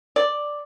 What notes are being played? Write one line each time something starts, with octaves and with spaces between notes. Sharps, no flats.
D5